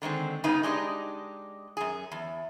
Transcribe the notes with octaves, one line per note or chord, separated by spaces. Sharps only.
D3 D#3 G#3 C4
G2 C#3 B3 D#4
G#3 D4 D#4 G4 D#5
F#2 G#4
E2